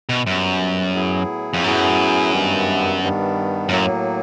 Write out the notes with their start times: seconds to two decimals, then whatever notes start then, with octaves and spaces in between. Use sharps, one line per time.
0.09 B2
0.27 F#2 A#2 G3 B3
0.94 A2 F#3 B3 E4 G#4
1.54 F2
1.64 F#2 A2 F#3 B3 E4 G#4
2.32 G2 D#3 G3 B3
3.01 G2 D#3 G3 B3
3.69 F#2 A2 F#3 A#3